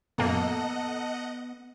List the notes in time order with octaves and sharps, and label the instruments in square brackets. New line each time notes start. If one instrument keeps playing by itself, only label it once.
[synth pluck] F#2 A#2 A#3 [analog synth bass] B3 [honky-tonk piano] A4 A#5 [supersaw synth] D#5 F#5